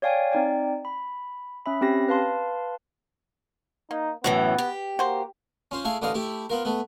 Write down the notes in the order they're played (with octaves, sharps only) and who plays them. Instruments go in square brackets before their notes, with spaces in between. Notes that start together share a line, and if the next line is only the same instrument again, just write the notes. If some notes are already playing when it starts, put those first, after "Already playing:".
[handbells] C#5 D5 F5 G5 G#5
C4 D#4 D5 G5
B5
C#4 E5 B5
C4 C#4 G4 A#6
B4 F5 A5 C6
[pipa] A#3 [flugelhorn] D#4
[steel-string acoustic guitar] F#2 A2 E3 [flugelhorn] B3 [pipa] F#4
[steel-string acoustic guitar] G4
[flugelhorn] A#3 [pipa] F#4 C5
[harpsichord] C#4 F4 C5
A3 E4 G#4 F5
A1 D3 E3 D#4 D#5 F5
A3 E4 G4
B3 F4 A#4
A3 B3